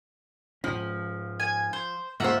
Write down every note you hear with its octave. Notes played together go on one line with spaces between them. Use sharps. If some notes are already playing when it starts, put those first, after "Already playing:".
G#2 F3 C#4
G#5
C5
D2 G#2 A#3 F4 C5 E5 F#5